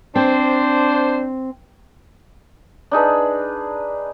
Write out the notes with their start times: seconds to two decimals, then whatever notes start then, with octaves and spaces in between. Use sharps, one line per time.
0.16 C4 D4 C5
2.91 D4 D#4 G#4 B4